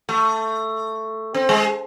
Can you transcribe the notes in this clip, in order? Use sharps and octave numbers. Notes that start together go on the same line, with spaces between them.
A3
C4
G#3